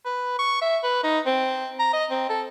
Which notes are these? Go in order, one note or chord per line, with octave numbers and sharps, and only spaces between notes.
B4
C#6
E5
B4
D#4
C4
A#5
D#5
C4
A4